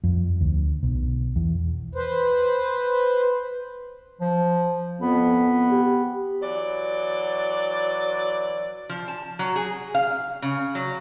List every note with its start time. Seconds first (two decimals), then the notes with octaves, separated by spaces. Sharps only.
0.04 F2
0.41 D2
0.83 B1
1.36 E2
1.95 B4 C5
4.21 F3
5.01 F2 B3
5.71 G4
6.42 E3 F#3 D5
8.89 F3
9.08 A5
9.39 F#3
9.56 G#4
9.95 F5
10.42 C#3
10.75 F#3